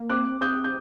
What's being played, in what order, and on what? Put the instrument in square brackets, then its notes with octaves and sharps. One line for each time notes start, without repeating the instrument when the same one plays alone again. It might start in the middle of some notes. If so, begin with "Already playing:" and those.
Already playing: [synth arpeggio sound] A#3
[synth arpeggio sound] C4 [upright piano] D6 F#6
[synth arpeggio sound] C4 [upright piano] D#6 G6
[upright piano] G6